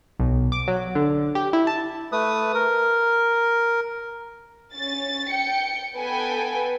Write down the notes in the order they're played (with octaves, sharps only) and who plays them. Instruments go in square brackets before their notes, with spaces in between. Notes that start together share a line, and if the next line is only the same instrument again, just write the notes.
[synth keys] B1
D6
F#3
D3
G4
E4
A5
[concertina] A3 B4 D#6
A#4
[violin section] C#4 A6
G5 C#7
B3 A4 B4 G5 G#5